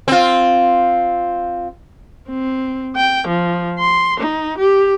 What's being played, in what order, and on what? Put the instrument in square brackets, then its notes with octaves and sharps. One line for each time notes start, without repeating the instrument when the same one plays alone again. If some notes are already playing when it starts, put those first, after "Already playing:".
[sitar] C4 F4
[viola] C4
G5
F3
C6
D#4
G4